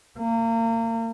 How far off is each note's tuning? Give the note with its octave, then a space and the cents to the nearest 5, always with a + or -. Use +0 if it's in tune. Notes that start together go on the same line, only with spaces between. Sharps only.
A#3 -35